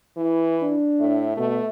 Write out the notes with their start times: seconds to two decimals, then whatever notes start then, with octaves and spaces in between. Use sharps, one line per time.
0.17 E3 E4
0.62 D4
1.00 A2 E5
1.37 B2 A3